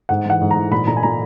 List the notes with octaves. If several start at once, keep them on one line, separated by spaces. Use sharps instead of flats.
G#2 F#5
E3 F#5
G#2
A#5
E3
A#2 B5
A#2 A#5
G#5
A#2 A#5